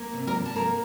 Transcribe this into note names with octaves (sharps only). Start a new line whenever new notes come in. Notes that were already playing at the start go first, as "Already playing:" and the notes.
Already playing: A#3
C3
A#4 A#5
C3
A5
A#3 A#4 A#5